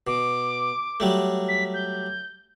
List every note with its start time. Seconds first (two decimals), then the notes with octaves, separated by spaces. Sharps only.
0.07 B2 D6
1.00 F#3 G3 A3
1.48 B6
1.74 G6